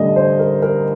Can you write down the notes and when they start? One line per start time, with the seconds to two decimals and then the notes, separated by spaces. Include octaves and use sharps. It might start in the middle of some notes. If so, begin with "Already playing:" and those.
Already playing: A1 G2 D3 D#5
0.16 C5
0.39 A#4
0.62 A#4